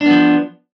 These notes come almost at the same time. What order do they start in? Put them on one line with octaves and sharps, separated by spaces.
D4 B3 F3